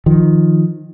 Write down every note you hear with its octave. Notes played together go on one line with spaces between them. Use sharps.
D#3 F3